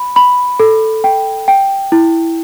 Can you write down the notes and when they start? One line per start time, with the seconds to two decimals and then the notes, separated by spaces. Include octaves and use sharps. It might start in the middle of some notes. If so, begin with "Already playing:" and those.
Already playing: B5
0.16 B5
0.60 A4
1.04 G5
1.48 G5
1.92 E4